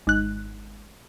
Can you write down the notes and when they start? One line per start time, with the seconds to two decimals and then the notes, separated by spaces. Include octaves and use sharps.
0.07 G#1 F#6